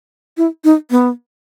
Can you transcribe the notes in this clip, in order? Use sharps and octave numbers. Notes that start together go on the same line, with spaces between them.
E4
D#4
B3